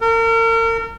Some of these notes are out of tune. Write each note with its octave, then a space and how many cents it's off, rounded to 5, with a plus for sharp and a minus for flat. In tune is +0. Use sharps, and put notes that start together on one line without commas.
A#4 -40